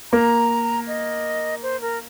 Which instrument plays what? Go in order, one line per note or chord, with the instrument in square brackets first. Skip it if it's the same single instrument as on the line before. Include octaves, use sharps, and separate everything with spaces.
[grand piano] A#3 [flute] A#5
[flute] D#5
C5
A#4